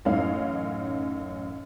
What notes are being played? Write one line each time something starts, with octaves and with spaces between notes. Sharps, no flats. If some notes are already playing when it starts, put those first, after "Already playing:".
A1 F#2 C#4 D#4 F5 F6